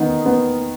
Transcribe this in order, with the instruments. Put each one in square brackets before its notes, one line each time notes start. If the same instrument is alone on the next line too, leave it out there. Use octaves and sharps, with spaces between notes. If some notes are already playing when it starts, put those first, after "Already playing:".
Already playing: [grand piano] D#3 B3 [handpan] D#4
[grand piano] B3